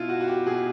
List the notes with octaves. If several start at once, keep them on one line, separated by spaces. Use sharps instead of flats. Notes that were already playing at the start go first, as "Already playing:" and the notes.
Already playing: B2 E4 F4
F#4
F#4
G4
B2 G#4